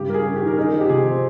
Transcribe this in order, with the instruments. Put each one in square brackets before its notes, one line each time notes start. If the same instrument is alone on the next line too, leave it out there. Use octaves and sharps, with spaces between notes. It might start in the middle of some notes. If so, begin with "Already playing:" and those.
Already playing: [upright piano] G2 C#3 G4
G3 A#4
G#4
C#4
G4
D#3
A#4
D#4 G#4
F3
G4
C3 G#4
C4